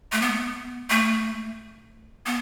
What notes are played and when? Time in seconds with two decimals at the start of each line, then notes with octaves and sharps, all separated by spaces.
0.12 A3
0.22 B3
0.90 A3
2.26 B3